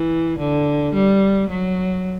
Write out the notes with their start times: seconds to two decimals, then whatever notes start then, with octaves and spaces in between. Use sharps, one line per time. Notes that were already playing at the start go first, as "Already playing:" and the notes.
Already playing: E3
0.39 D3
0.94 G3
1.49 F#3